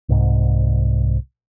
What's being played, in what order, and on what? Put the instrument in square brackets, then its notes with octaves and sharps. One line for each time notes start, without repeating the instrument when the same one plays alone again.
[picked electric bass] C2 G#2